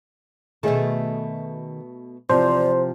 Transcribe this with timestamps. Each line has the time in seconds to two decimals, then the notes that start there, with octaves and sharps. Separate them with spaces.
0.63 B2 D#3 A3 G#4 E5
2.30 E2 C3 F3 C5 D5